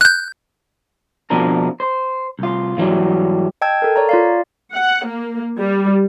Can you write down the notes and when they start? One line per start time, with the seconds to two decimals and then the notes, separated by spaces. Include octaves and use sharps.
0.01 F#6 G6
1.30 F2 B2 F3 D4 A#4
1.80 C5
2.39 C2 F4
2.77 G#2 E3 F#3 G3
3.61 D#5 G5 A5 E6 G#6
3.82 A4 A#4
3.96 C#5 D5 A#5
4.09 F4 D5 F5
4.74 F#5
5.06 A#3
5.59 G3